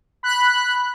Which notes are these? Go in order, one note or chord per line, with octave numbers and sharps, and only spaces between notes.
B5 F#6